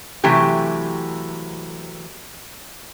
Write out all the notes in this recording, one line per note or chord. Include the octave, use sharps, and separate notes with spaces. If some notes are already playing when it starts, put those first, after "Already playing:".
C3 E3 F#3 A3 G4